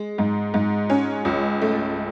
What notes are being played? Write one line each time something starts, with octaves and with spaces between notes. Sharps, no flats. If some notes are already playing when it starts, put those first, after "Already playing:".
Already playing: G#3
G#2
G#2
C#4
C#2
A3